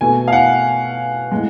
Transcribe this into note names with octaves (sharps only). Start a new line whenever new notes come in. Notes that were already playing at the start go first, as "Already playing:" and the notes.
B2 A3 G#5
F5
F#5
A2 G#3